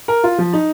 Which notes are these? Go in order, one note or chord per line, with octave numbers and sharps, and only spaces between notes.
A#4
F4
F3
D#4